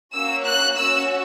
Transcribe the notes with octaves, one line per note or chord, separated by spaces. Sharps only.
A#3 C#4 F#4 E6
F#6
C#4 F#4 E6